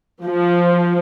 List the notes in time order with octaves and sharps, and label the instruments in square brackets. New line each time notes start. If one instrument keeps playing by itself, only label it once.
[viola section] F3